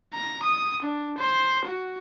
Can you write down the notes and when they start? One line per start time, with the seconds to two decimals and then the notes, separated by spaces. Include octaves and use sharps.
0.13 A#5
0.43 D#6
0.82 D4
1.18 C5
1.65 F#4